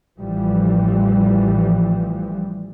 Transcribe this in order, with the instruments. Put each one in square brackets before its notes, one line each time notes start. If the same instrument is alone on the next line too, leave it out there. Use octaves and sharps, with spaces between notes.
[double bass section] A1 A2 E3 F3 G3